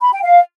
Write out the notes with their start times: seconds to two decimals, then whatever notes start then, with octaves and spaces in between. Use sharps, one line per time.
0.01 B5
0.12 G5
0.23 F5